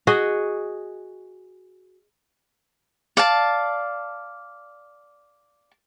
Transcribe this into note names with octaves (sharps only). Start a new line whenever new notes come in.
F#4 G#4 D#5
D5 F5 A5